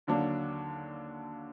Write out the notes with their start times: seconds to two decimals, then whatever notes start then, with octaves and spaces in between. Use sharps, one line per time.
0.07 D#2 D3 F#3 A#3 D4